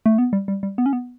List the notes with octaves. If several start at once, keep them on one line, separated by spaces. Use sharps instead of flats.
A3
B3
G3
G3
G3
B3
C#4
B3